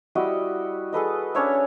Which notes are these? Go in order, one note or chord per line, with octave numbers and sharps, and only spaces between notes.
G3 E4 F#4 D#5
G#4 A4 B4 D#5
C#4 D4 C#5 E5